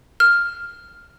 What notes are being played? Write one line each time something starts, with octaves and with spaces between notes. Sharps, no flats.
F6